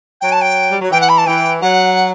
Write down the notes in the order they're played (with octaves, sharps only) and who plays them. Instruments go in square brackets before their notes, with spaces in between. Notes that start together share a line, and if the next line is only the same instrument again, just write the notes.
[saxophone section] F#3 [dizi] G5
[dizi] A5
G5
[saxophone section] G3
F#3
[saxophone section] E3 [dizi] G5
[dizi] F#5
B5
A5
[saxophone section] E3 [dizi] G5
[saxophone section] F#3 [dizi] F#5